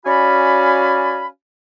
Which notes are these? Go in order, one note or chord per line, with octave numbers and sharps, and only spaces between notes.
C#4 F#4 D5 F5 G#5 B5